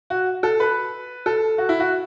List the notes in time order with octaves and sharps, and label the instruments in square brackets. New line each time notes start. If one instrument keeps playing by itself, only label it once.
[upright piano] F#4
A4
B4
A4
F#4
E4
F#4